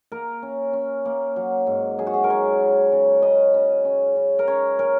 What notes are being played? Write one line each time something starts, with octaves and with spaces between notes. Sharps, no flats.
A#3 A#4
C#4
C#4
A#3
F#3
G#2
F#3 G#4
F#4
G#4
A#4
F#3 C#5
C#3
C#3
C#3 D#5
C#3
C#4
C#3
A#4
C#4 C#5
C#4 A#4